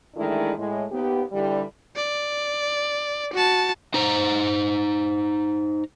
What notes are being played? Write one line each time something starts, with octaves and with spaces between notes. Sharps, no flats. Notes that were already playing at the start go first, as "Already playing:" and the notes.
D#3 E3 G#3 A3 D4 E4
A2 G#3
D#2 B3 G4
D3 E3 G3
D5
F#4 A5
D#4 C5 A#5